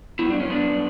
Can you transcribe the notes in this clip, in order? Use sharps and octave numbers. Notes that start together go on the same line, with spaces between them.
G2 F#3 B3 E4
D4
C#4
B3 D4